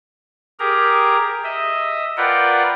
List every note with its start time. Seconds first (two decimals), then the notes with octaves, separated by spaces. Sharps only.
0.59 G4 G#4 A#4 A#5
1.44 D#5 E5
2.17 F4 A#4 B4 D5 F#5 G5